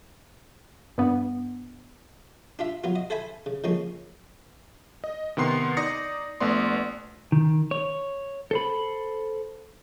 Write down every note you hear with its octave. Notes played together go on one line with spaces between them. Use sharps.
G2 B3
D4 F4 E5
F#3 B3 F4
D#5
A4 C5 E5 G#5 B5
C#3
C#3 F3 G#3 A#3 C#4
D#5
C3 D#3 B3 C6 C7
D#4 D5 D#6 A#6 C#7
A#1 A3 B3 D5 C6
D#3
C#5
A4 C5 B5